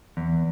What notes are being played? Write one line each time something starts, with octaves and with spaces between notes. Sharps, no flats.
E2